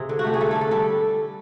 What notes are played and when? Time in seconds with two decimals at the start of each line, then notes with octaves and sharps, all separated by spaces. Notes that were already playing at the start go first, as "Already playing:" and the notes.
Already playing: C3 G#4
0.09 D3
0.19 F#4
0.25 A3 G4
0.34 G#4
0.40 A3 A4
0.51 D3 A4
0.61 A4
0.71 G3 A4